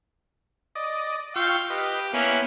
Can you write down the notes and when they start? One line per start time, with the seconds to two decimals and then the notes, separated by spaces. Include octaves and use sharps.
0.75 D5 D#5
1.36 F4 F5 G5 C#6 E6
1.70 G4 B4 D#5
2.13 A#3 B3 C#4 E4